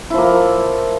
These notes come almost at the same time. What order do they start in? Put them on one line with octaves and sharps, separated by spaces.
E4 F3 A#3